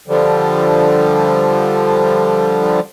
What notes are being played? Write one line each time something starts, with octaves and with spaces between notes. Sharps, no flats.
D3 F3 G3